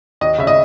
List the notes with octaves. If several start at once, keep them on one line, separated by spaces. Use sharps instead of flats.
D#2 D#5
C#3 E5
D#5